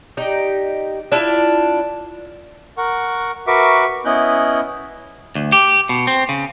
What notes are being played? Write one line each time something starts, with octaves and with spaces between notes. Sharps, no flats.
D#4 G4 D5
D4 E4 F4
A#4 F#5 C#6
F#4 A#4 B4 E5 C#6 D6
B3 C#4 E4 D#5 F#6 G6
D2
G4
B2
C4
C#3